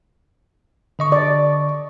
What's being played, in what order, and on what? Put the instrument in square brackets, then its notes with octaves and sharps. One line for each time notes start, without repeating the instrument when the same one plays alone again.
[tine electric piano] D3 D#5 C#6
[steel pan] D5